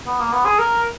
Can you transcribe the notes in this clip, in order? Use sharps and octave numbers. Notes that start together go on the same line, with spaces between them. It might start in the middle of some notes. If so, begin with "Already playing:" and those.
B3
A#3
B3
G#4
A#4